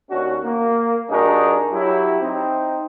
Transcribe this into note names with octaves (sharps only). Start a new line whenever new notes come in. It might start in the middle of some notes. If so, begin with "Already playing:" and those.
D#2 C#4 D4 F#4
A#3
G2 D4 D#4 F#4 G#4 A#4
F#3 E4 G4
C4 D#4